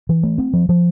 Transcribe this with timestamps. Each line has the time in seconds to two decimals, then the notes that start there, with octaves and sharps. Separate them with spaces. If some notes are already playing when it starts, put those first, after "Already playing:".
0.09 E3
0.23 A3
0.38 C4
0.53 F3
0.69 F3